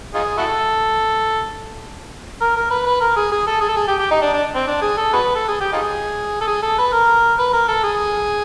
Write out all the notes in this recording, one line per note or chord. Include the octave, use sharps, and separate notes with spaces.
D#4 F4 G#4
E4 F#4 A4
A#4
A#4
B4
B4
A#4
G#4
G#4
A4
G#4
A4
G#4
G4
G4
D#4
D4
D4
C4
D4
G#4
A4
F#4 G#4 B4
A4
G#4
G4
D#4 F4 G#4
A4
G#4
A4
B4
A#4
B4
A#4
A4
G#4